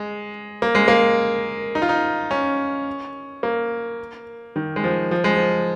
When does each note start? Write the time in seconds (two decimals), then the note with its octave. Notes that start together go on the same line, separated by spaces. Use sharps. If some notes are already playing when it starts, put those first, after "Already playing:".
Already playing: G#3
0.62 A#3
0.75 G#3
0.88 A#3
1.75 D#4
1.82 F4
1.89 D#4
2.31 C#4
3.43 A#3
4.56 D#3
4.76 G#3
4.84 F3
5.11 F3
5.24 G#3
5.37 F3